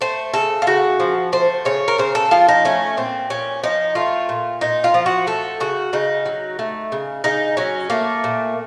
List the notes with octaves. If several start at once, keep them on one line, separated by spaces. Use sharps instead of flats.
A3 C5
C#3 A4
F4
C#3 F#4
F3
A3 C5
C#3 C#5
A#4
C#3 C5
A4
F3 F4
D#4
A3 C#4
A#2 C4
A#2 C#4
F3 D#4
A3 F4
A#2
A#2 D#4
F4
F3
F#4
A3 A4
C#3 F#4
C#3 D#4
F#3
A3
C#3
C#3 D#4
F#3 C#4
A3 A#3
A#2